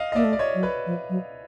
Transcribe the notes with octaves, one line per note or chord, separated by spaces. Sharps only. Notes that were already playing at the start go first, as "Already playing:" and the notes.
Already playing: D#5 F5
D#5
A#3 D5 E5
A3
D5
C#5 D#5
F#3
B4 C#5
F3
F#3